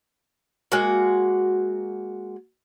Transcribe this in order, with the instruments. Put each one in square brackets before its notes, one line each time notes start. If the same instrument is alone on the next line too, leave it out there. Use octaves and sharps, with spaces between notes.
[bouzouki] G#3 A#3 F#4